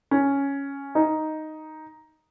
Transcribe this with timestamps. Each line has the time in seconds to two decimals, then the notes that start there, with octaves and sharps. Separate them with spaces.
0.11 C#4
0.95 D#4